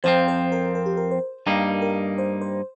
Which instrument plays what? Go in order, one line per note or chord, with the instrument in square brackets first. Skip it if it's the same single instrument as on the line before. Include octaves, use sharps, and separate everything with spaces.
[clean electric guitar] F2 F3 C4 [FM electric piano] C5
[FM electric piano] C5
A#4
A#4
G4
A#4
C5
[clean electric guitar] G2 G3 A#3 D#4 [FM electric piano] A#4
[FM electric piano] A#4
C5
C5